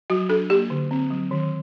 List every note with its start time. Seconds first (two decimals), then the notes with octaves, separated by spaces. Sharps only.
0.10 F#3 F#4
0.29 D4 A4
0.50 A#3 G4
0.70 D3
0.91 C4
1.10 F#3
1.31 D#3